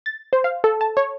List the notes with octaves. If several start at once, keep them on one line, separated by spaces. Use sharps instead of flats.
A6
C5
F5
A4
A5
C#5